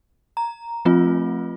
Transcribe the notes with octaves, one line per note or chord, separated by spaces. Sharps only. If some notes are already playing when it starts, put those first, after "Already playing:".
A#5
F3 A3 C4 F4